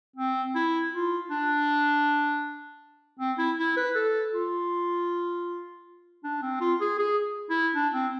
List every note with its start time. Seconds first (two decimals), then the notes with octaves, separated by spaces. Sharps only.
0.16 C4
0.55 E4
0.92 F4
1.30 D4
3.19 C4
3.38 E4
3.58 E4
3.77 B4
3.95 A4
4.33 F4
6.24 D4
6.42 C4
6.61 F4
6.81 G#4
6.99 G#4
7.50 E4
7.75 D4
7.94 C4